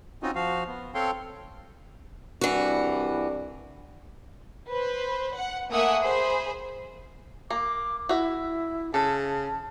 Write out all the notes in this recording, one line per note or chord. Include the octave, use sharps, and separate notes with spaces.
C4 C#4 D#4 F4 F#4 D#5
F3 F#4 F5
B3
C4 A4 C#5 F5 G5 C6
C2 E3 G3 D4 F#4
B4 C5
F#5
A3 A#3 E5 F#5 G#5 D#6
G#4 C5 B5
A#3 D6
E4 F#4 E5
C#3 A4 A5